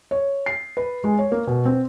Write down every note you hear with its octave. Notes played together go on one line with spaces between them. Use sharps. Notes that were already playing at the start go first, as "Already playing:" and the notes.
C#5
C7
B4
G#3
C#5
A#3
B2
C4